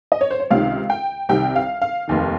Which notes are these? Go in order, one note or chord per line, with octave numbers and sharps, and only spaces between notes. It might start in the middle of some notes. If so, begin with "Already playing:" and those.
D#5
C#5
C5
C#5
C#2 C3 D#3 F5
G5
C2 C3 D#3 G5
F5
F5
F1 D#2 D#3